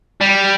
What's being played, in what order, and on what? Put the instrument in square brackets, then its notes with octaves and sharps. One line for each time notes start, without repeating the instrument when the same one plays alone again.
[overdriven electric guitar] G3